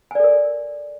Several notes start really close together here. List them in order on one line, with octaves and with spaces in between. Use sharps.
G#5 D5 A4 A#4